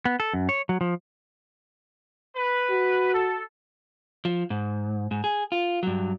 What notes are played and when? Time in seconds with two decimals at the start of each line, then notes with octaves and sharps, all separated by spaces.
0.05 B3
0.20 A4
0.33 F#2
0.49 C#5
0.69 F#3
0.81 F3
2.35 B4
2.70 F#4
3.12 A4
4.25 F3
4.50 G#2
5.11 G#2
5.24 G#4
5.52 F4
5.83 G2 F#3